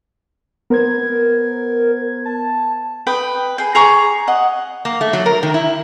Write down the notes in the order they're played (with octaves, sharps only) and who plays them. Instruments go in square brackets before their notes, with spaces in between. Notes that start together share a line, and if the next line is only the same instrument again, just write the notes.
[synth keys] B3 C5 G#6 [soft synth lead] A#4
[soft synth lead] A5
[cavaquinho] B4 G5 D#6
G#4 G5
G#4 A#5 C#6 D6
D#5 F#5
[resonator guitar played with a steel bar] A#3
A3
F#3
A#4
D#3
E4